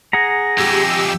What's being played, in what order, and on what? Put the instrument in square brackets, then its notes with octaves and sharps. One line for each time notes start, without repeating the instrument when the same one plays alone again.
[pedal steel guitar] G#4 F#5 A#5 [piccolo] A#6
[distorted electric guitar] F2 G#3 [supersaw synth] G4 E6